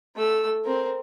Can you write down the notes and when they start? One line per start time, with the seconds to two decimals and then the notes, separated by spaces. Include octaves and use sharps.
0.16 A3 E6
0.65 C4 A#4